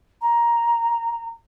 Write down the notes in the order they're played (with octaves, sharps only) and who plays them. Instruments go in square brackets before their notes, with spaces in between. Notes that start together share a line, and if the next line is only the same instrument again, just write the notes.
[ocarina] A#5